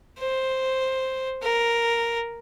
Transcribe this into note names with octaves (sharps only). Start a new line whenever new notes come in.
C5
A#4